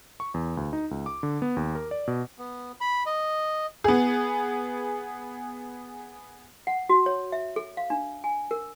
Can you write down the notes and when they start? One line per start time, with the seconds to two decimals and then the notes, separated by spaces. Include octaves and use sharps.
0.20 C#6
0.34 E2
0.57 D2
0.73 D#4
0.91 C#2
1.06 D6
1.23 D3
1.42 B3
1.57 D#2
1.75 A#4
1.91 D5
2.07 B2
2.39 B3
2.81 B5
3.06 D#5
3.84 B3 G#4
6.67 F#5
6.89 F#4
7.06 C#5
7.32 E5
7.56 A4
7.77 F5
7.90 D4
8.24 G#5
8.51 A#4